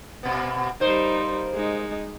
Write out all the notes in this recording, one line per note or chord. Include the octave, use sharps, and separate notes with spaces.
B2 B3
G3 A#3 D#4 C5
G#3 D#4